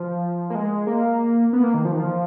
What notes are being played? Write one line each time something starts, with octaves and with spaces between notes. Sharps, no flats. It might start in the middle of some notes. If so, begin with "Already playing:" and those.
Already playing: F3
A#3
G#3
A#3
B3
A#3
D#3
F3
D#3
F3